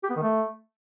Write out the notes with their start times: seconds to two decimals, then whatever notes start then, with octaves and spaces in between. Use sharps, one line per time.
0.04 G4
0.10 B3
0.16 D#3
0.23 A3